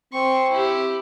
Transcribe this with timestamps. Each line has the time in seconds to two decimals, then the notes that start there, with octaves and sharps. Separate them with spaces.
0.13 C4 C6 C#6
0.51 E4 G4